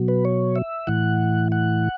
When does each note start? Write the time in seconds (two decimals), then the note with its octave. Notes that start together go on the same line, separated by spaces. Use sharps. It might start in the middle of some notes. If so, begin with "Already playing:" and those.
Already playing: B2 F#3
0.08 B4
0.25 C#5
0.56 E5
0.87 A2 E3 F#5
1.52 F#5